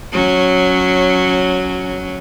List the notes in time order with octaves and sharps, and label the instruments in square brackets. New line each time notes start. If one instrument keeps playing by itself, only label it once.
[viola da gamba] F#3 C#4